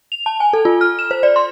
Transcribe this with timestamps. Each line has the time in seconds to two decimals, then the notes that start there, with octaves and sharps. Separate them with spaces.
0.12 F7
0.26 A5
0.40 G#5
0.53 A4
0.65 F4
0.81 F6
0.99 E7
1.11 C5
1.23 D5
1.36 C6